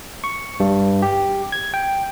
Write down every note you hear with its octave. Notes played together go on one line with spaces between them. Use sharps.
C#6
G2
G4
G#6
G5